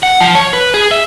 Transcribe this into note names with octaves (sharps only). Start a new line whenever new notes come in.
F#5
F3
C#5
B4
G#4
E5